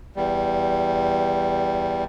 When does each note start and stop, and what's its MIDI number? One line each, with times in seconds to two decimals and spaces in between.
0.16 2.04 40
0.16 2.04 55